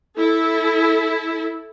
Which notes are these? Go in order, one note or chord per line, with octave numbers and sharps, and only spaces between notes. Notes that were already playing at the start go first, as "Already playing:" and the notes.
E4 A4